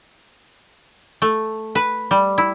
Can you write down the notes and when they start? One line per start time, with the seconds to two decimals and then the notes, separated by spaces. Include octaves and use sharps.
1.22 A3
1.75 B4
2.11 G3
2.38 E4